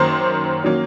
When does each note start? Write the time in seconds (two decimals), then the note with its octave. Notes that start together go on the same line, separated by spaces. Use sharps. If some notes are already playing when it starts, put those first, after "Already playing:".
Already playing: F#2 D#3 F#3 A#3 C#4 C5
0.64 D#3 F#3 A#3 C#4